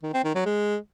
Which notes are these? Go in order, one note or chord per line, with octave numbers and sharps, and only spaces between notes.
D#3
C4
D#3
F#3
G#3